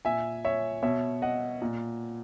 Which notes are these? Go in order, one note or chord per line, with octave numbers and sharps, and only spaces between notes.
A#2 E5 G#5
C#5 E5
B2 C#5 E5
D#5 F#5
A#2